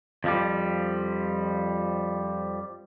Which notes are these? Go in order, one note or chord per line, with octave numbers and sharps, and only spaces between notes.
F2 F3 G3